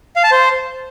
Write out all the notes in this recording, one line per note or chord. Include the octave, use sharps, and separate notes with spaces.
F5
A5
C5